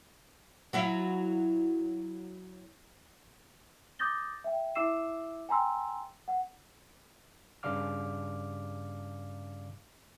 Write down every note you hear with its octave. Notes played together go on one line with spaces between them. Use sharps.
F#3 E4 F4
D6 D#6 G6 A6 A#6 G7
E5 G5
E4 E5 D6 E6 C7 E7
G5 G#5 A#5 C6 E6
F#5
G2 C#3 D5 F5 D6 F6